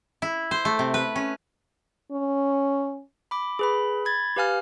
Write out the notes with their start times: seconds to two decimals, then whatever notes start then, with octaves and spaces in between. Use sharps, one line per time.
0.22 E4
0.51 C5
0.65 A3
0.79 C3
0.94 B4
1.16 C#4
2.12 C#4
3.31 B5 D6
3.59 G#4 B4 B5
4.05 B5 G#6 A6
4.36 G4 B4 F5 G#5 F6